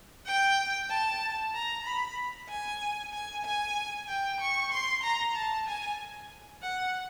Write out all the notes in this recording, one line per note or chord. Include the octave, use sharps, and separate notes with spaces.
G5
A5
A#5
B5
G#5
G#5
G#5
G5
C#6
C6
A#5
A5
G#5
F#5